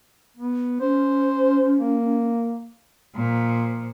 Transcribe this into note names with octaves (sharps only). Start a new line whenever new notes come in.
B3
C#4 C5
A#3
A#2 F3